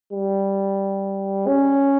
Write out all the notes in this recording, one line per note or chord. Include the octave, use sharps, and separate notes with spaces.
G3
C#4